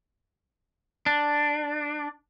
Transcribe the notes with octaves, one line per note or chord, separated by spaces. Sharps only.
D4